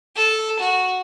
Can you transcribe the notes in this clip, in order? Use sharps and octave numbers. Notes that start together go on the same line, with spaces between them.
A4
F#4